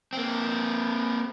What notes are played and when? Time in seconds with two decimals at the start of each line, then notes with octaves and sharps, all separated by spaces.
0.13 A#3 C4